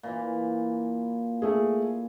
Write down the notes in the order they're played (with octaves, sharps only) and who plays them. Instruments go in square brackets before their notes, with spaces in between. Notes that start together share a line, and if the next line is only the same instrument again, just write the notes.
[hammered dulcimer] A#2 E3
[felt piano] A3 G#4